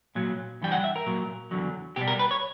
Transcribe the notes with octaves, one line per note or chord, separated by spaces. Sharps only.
A#2 F#3
G2 E3 G3 G5
F#5
E5
A#4
A#2 F#3
E2 D3 F#3
B2 G3 G4
A#4
B4
C#5